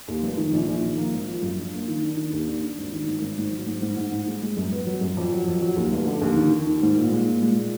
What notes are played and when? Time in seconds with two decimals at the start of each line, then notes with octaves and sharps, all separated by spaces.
0.08 D#2
0.23 F1
0.38 D#3
0.53 A#1
0.67 A#1
0.83 D#3
0.97 A#3
1.13 G#1
1.27 F3
1.42 F#2
1.58 D4
1.73 A#3
1.88 D#3
2.03 D4
2.17 D#3
2.33 D#2
2.47 D4
2.63 D4
2.77 G#1
2.93 D#3
3.07 G#1
3.22 G#1
3.37 G#2
3.51 F#3
3.67 G#2
3.82 G#2
3.97 G#2
4.12 G#2
4.27 G#3
4.42 G#3
4.57 F#2
4.72 B3
4.86 F#3
5.01 F#2
5.17 F2
5.32 F#3
5.47 F2
5.61 F#3
5.76 D#2
5.92 F1
6.07 D3
6.21 D#2
6.36 D#3
6.51 D#3
6.66 D#3
6.82 G#2
6.96 A#2
7.11 G#3
7.26 A#2
7.42 G#3
7.57 A#2